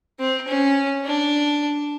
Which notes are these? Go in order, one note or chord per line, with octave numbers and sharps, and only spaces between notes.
C4
C#4
D4